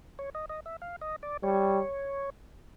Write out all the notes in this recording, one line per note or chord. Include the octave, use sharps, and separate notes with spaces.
C#5
D#5
D#5
E5
F5
D#5
D5
G3 C#5